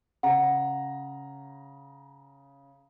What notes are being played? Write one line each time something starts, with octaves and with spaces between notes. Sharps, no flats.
C#3 F#5 A#5